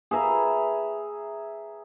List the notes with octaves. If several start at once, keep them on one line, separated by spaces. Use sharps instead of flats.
G#4 B4 E5 A#5